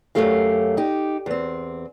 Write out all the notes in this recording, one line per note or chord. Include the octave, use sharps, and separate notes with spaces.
F#2 D#3 F#3 A3 G4 F5
D#4 G4
E2 C4